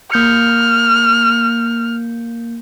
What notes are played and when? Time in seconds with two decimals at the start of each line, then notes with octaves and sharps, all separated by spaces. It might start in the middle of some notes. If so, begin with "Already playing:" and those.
0.12 A#3 F6 G6 C#7